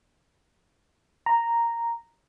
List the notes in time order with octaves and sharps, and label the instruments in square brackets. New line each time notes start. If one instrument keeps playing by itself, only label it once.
[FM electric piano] A#5